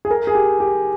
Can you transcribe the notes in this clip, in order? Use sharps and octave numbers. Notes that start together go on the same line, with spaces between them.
G#4
A#4
G#4
G4
G4